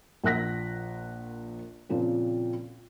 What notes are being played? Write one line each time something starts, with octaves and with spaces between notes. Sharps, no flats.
A#1 A#4 F#5 F#6 A#6 B6
A#2 C#3 F3 A#3 C4